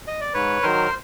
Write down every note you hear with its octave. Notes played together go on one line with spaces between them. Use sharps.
D#5
D5
G#2 B4 C#5
D#3 F#3 A#4 C5